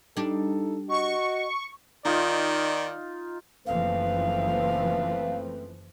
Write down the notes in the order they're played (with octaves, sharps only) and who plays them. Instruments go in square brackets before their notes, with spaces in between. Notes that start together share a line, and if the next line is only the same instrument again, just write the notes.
[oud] G3 D4 [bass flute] D#4 [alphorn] A4
[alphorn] F#4 [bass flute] D#5 [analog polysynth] C#6
[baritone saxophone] D#3 [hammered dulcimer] D#4 F4 [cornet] D5
[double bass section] F#1 E3 F3 [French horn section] A3 C4 B4 [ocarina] F5